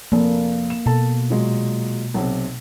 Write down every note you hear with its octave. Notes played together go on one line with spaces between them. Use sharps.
F1 A#3
E7
B2 A4 A5
A#2 F#3 G#3
B1 C3